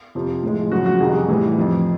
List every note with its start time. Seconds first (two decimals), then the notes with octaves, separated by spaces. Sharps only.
0.15 F2 C3 F3
0.43 A2 F3 G#3
0.72 F#2 C#3 F3 F#4
0.86 F#4
1.00 F2 C3 D#3 G3 G#4
1.28 A2 E3 G3
1.56 F2 C3 F3